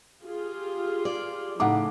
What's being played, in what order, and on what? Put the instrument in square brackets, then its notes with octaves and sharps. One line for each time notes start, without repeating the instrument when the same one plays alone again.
[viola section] F4 G4 G#4
[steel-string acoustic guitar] D5
[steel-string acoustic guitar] A2 C#3 [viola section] F3 A3 [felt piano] D#4 F#5 D6